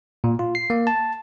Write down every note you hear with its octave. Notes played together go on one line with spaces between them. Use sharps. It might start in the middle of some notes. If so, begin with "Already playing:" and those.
A#2
F4
C7
A#3
A5